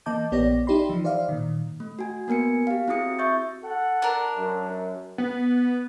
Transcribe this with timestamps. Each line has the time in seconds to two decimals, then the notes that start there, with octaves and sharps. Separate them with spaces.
0.06 E3 A#3 D#5 A5 D6 G6
0.32 A#1 B3 G4 C#5 D5 A#6
0.67 D#4 E4 G4 D5 B5 C6
0.89 E3 F3
1.04 C5 D5 E5 F5
1.29 A#2 D#3
1.80 A3
1.99 F#4 G#5
2.28 A#3 B3 A#4 G#5 C#7
2.67 G4 F5
2.88 C4 E4 F#4 G#4 D#6 C#7
3.19 E5 C#6 G6 A6
3.63 A4 F#5
4.02 D4 A#4
4.36 F#2
5.18 B3